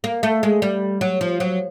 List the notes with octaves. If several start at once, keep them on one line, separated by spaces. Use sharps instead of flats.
A#3
A3
G#3
G3
F#3
F3
F#3